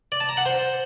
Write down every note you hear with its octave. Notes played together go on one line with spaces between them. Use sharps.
D5
A5
A#5
F#5
C5